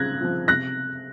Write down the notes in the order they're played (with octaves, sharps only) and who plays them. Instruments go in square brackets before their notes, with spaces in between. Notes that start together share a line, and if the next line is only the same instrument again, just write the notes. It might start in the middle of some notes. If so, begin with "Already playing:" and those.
Already playing: [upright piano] C#3 C4 F4 F#6 G#6 A#6
F3 C4 F4
C3 F#6 A#6